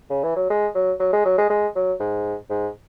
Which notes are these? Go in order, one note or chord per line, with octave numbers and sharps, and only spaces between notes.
C#3
E3
F#3
G#3
F#3
F#3
G#3
F#3
G#3
G#3
F#3
G#2
G#2